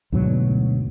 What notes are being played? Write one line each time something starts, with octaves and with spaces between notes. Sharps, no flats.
D2 G#2 B2 F#3